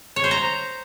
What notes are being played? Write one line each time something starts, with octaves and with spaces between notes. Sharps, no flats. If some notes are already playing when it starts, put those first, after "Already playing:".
C#5
C5
A#5